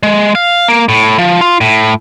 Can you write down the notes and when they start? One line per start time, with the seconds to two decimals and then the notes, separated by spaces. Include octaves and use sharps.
0.03 G#3
0.35 F5
0.68 A#3
0.89 A2
1.18 F3
1.41 F4
1.61 A2